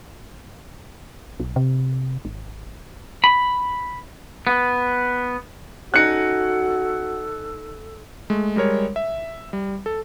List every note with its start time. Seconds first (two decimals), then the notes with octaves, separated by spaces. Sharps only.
1.40 B1
1.56 C3
2.25 G#1
3.24 B5
4.47 B3
5.94 C#4 D#4 F#4 A4 F#6 C#7
8.30 G#3 A3
8.56 G3 G#3 A#4 C#5
8.96 E5
9.53 G3
9.86 A4